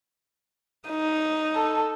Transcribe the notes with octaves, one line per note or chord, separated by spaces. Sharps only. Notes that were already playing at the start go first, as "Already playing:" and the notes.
D#4
A4